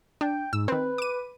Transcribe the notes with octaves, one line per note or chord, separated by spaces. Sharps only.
D4 G5
G#2 E6
D#3 C4 B4
D6 D#7